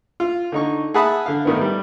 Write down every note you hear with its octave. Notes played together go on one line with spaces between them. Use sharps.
F4
D3 D#4 C#6
G#4 E5 F#5 A5 B5 D#6
D3 F5
A2 D#3 B3
G3